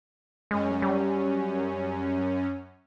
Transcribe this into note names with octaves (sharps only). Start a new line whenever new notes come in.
F#2 G#3 C#4
G3